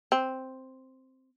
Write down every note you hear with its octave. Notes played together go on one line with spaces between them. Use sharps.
C4